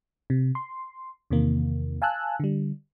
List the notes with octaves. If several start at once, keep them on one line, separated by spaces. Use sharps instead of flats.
C3
C6
E2 C3 D#3 A#3
F5 G#5 A5 E6 F#6
D3 G3